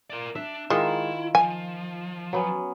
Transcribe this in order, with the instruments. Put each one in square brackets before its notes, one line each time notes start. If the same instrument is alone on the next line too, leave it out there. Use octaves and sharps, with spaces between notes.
[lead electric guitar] A#4 D5
[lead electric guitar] D4 [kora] E5
[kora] D#3 F4 A#4 [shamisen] G#3 [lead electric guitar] E4
[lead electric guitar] F3 [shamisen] G#5
[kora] F#3 B3 C#4